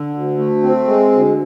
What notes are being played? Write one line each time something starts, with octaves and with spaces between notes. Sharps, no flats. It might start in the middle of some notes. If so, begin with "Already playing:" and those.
Already playing: D3
D2
A3
C4
G#3
D2